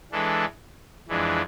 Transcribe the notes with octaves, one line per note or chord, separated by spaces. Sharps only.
E3 G#3 D4 A4
F2 E3 G#3 D4